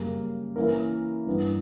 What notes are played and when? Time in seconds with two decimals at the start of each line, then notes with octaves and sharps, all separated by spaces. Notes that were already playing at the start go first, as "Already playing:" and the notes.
Already playing: F#2 C#3 G3 A#3
0.56 E3 A#3 C#4 E4 A#4
1.27 G2 E3 B3 D4